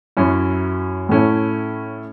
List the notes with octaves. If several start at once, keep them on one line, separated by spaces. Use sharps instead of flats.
F#2 F#3 C#4 E4
A2 A3 C#4 E4